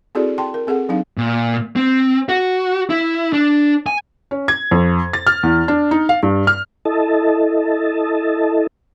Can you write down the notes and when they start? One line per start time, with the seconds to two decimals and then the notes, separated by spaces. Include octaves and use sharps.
0.15 C4 E4 F#4 G#4 A4 D5
0.38 G5 A5 C6
0.54 A#4
0.67 C4 G#4 A4 F#5
0.89 F#3 C4 D4 D#4 F5
1.18 A#2
1.76 C4
2.29 F#4
2.90 E4
3.33 D4
3.86 G#5
4.31 C#4
4.48 G#6
4.71 F2
5.13 A6
5.27 F6
5.43 E2
5.68 D4
5.91 D#4
6.09 F5
6.23 G2
6.47 F6
6.85 E4 A4 D#5 A5